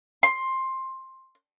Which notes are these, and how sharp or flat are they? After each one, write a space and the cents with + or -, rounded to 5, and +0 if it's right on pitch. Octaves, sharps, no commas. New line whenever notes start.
C6 +15